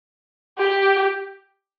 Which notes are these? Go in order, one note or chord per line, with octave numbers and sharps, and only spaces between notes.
G4